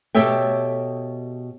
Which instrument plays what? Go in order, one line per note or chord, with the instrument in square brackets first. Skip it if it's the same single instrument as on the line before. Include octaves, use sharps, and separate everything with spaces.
[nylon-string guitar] B2 G4 A4 C#5 E5 G5